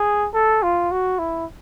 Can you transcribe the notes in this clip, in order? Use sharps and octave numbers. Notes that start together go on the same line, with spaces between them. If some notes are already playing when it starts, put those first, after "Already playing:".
Already playing: G#4
A4
F4
F#4
E4